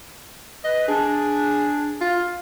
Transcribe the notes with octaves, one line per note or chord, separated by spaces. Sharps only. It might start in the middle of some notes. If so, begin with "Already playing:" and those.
B4 D#5
D4 G#4
F4